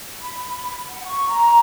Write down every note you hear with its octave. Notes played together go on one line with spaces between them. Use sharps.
B5
F#5
C#6
A#5